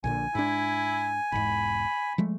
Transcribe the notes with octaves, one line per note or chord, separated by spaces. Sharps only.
A#1 A#2 D3 G#5
G#2 D4 E4
E1 G#2 B5
F3 G#3 A3